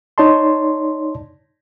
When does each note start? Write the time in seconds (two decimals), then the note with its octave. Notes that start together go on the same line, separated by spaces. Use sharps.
0.18 D#4 C#5 D5 A5 C6